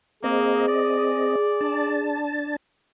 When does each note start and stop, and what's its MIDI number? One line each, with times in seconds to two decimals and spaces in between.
0.24 0.65 58
0.24 1.36 60
0.24 2.18 68
0.24 1.36 75
0.68 2.05 74
1.61 2.56 62
1.61 2.56 81